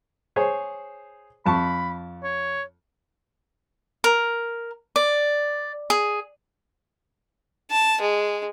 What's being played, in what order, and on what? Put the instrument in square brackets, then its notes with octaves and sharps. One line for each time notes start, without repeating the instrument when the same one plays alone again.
[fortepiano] G#4 C5 C#5
[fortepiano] F2 A5 C#6 [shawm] B5
[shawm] C#5
[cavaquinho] A#4
D5
G#4
[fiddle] A5
G#3